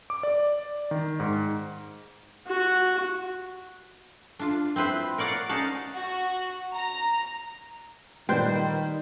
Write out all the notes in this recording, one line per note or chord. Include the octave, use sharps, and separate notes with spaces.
D6
D5
D#3
G#2
F#4
D4 F4
C4 E4 B4 C5
A#4 C#5 D5 F5 F#5
C#4 D#4 F5 F#5 A5
F#4
A#5
A#2 D#3 G3 B4 C5 G5 G6